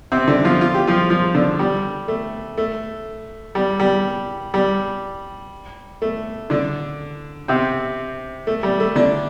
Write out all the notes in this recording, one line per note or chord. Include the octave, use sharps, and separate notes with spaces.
C3 C4
D3 D4
F3 F4
F4
G4
F3 F4
F3 F4
D3 D4
G3
A3
A3
G3
G3
G3
A3
D3 D4
C3 C4
A3
G3
A3
D3 D4